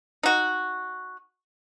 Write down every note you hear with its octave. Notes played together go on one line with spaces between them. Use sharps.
D#4 F#4